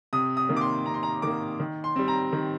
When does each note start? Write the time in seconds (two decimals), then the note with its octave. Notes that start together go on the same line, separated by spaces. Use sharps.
0.13 C3 D#6
0.37 D#6
0.49 D#3 A#3
0.57 D6
0.61 C6
0.86 C3 A#5
0.94 C6
1.03 A#5
1.22 D#3 A#3 D6
1.60 D#3
1.84 C6
1.96 G3 C4
2.08 A#5
2.33 D#3